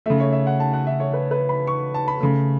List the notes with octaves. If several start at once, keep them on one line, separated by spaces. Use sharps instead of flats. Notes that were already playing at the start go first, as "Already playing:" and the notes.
C#3 A3 E5
C#5
E5
F#5
A5
F#5
E5
C#5
B4
B4
B5
C#6
A5
B5
C#3 A3